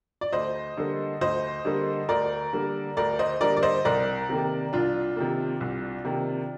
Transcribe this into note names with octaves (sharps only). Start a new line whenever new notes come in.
D5
D2 C5 D#5
D3 G3 A#3
D2 C5 D#5
D3 G3 A#3
D2 A#4 D5
D3 G3 A#3
D2 A#4 D5
C5 D#5
D3 G3 A#3 A#4 D5
D5
C5 D#5
C2 A#4 D5
C3 D#3 A#3
C2 D4 F4
C3 D#3 A#3
C2
C3 D#3 A#3